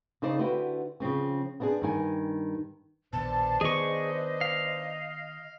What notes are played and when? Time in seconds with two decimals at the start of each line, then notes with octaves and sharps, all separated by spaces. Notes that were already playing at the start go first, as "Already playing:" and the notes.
0.22 C#3 D#4 C5 D5
0.39 D3 E4 F#4 G4 B4 C5
1.00 C#3 F3 C4 C#4
1.60 B3 C4 D4 F4 G#4
1.82 G2 D#3 G#5
3.13 A#1 D#2 B2 D4 B4 C5 A5
3.61 D#3 B3 G#4 D#5 C#6
4.41 F5